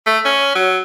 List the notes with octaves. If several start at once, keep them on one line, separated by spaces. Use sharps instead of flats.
A3
C#4
F#3